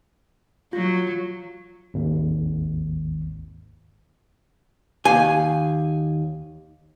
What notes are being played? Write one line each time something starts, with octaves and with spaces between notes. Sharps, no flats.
F#3 F4
G#1 D#2
D#2 G#5